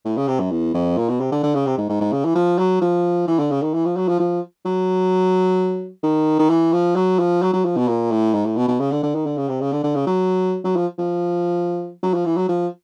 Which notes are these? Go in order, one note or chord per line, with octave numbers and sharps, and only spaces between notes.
A2
C#3
C3
F#2
E2
F2
A#2
B2
C3
D3
D3
C#3
C3
G#2
G#2
G#2
C#3
E3
F3
F#3
F3
E3
D3
C#3
D#3
E3
F3
F#3
F3
F3
F#3
D#3
D#3
E3
F3
F#3
F3
F#3
F#3
F3
B2
A#2
A2
G#2
A2
B2
B2
C#3
D3
D3
D#3
D3
C#3
C3
C#3
D3
D3
C#3
F#3
F#3
F3
F3
F#3
F3
E3
F#3
F3